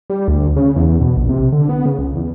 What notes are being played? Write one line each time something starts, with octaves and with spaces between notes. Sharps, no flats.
G3
D2
C#3
E2
B2
A#1
C3
D3
B3
C#3
C#2
E2